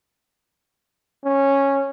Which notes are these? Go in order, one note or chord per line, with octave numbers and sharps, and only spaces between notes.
C#4